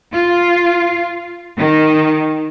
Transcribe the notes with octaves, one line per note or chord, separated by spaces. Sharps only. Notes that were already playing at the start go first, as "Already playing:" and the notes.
F4
D#3